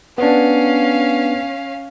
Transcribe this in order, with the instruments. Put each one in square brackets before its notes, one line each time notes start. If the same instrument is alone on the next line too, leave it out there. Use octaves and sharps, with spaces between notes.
[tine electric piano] B3 D4 [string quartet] C#4 F5